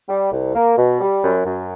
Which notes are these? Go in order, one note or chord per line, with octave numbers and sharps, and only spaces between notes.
G3
C2
A#3
B2
G3
F#2
F#2